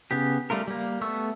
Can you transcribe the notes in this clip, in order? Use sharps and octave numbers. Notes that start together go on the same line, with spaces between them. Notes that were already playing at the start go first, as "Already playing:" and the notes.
C#3 B3 G4
G3 A3 F4 A#4
G3 A#3
A3 B3 C#6 E6